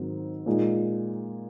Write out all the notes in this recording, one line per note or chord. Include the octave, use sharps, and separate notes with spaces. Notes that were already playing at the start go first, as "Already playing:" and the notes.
Already playing: G#2 D#3 F#3 C4
A#2 G#3 D#4